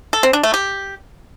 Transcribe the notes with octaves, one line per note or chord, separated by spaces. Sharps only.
A4
C4
D4
A3
G4